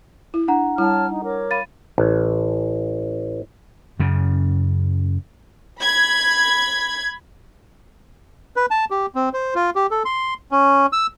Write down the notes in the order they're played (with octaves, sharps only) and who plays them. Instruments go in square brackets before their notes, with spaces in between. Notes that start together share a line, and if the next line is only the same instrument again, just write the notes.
[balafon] E4
[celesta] D4 F#5 A#5
[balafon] G3 E4 [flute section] C#5 A5 F6
[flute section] D#4
A#4 C#5 D6
[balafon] F5 B5 [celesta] A6 D#7
[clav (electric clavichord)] A1
[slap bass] F#2 C#3
[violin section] B5 G#6
[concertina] B4
A5
G4
C4
C5
F4
G4
A4
C6
C#4
E6